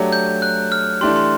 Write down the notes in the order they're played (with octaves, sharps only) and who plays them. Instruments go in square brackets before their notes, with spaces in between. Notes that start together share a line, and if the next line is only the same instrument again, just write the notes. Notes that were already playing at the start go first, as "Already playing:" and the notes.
Already playing: [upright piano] F#3 A3 D4 G4
[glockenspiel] G6
F#6
F6
[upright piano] E3 A3 D4 G4 [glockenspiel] C6
[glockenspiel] C6